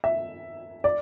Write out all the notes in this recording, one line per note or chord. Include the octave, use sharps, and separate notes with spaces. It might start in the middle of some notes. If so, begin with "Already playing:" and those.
E5
D5